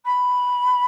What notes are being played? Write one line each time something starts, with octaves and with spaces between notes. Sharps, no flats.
B5